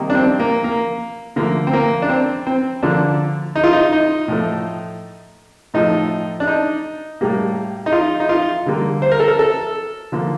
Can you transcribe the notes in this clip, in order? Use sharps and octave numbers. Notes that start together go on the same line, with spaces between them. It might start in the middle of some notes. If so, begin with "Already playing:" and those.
Already playing: C3 D#3 G3 A#3
D4
C4
A#3
A#3
D3 F3 A3 A#3
C4
A#3
D4
C4
C4
D3 F3 A#3 D4
D#4
F4
D#4
D#4
A2 F3 A3
A2 F3 A3 D#4
D4
D#4
A2 G3 A#3
D#4
F4
D#4
F4
D3 G3 A#3
C5
A#4
A4
A#4
A4
D3 F3 A#3